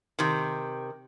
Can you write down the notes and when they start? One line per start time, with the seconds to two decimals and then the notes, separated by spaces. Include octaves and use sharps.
0.19 C3 D#3